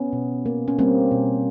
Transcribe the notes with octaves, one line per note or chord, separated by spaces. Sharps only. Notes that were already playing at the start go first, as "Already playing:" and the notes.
Already playing: B3 C#4
B2
A#3
C#4
G3 A#3 C4
B2